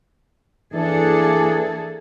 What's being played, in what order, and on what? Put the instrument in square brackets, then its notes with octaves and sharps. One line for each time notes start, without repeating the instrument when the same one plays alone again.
[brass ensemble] E3 D4 [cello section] A#3 G#4 A4